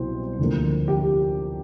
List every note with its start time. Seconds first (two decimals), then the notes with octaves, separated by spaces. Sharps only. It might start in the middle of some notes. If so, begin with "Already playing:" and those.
Already playing: C2 B2 F#3 C5
0.39 D2 D3 F3 A#3
0.88 G4